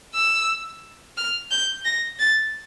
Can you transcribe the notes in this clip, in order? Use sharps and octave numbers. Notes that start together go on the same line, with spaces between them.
E6
F6
G6
A#6
A6